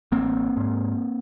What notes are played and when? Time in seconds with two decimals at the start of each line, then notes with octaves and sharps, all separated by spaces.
0.12 A1 A#3 C4
0.57 G#2